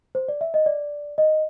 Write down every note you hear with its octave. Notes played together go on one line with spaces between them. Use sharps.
C5
D5
E5
D#5
D5
D#5